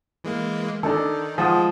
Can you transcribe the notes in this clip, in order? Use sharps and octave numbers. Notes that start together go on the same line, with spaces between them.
E3 G#3 A#3
D#3 D4 D#4 A4
F3 G#3 F#5 D#6